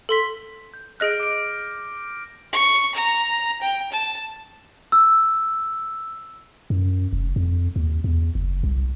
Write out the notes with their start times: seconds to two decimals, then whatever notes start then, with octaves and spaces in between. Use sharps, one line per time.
0.09 A4 C6 B6
0.74 G6
1.00 G#4 D#5 F6 F#6 A#6 D7
1.20 D6 D7
2.52 C#6
2.95 A#5
3.62 G5
3.92 A5
4.92 E6
6.70 F#2
7.13 F1
7.36 F2
7.76 D#2
8.04 E2
8.35 F#1
8.63 C2